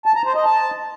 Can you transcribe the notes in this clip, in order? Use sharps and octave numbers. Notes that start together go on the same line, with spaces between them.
A5
A#5
C5
D#5
A5